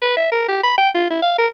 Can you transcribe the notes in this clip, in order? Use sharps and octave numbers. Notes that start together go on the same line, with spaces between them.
B4
E5
A#4
G4
B5
G5
F4
E4
F5
A#4